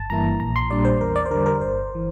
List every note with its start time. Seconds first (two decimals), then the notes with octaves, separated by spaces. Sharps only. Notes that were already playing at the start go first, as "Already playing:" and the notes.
Already playing: G1 A5
0.10 G2 E3 A#3 E4 A#5
0.40 A#1 A#5
0.56 C6
0.70 A#2 G3 D4 D5
0.85 C5
1.01 E2 A#4
1.16 D5
1.26 C5
1.31 D3 G3 A#4
1.46 A#4
1.60 G1 C5
1.95 E3